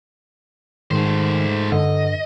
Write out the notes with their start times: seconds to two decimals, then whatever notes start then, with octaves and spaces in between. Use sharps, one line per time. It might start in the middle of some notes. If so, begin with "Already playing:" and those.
0.91 G#2 D#3 A3 C5
1.72 G2 D3 D#5